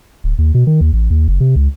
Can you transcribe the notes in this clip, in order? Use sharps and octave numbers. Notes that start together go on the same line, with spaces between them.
D1
D#2
B2
D#3
D#2
A1
D#2
F#1
C3
C#2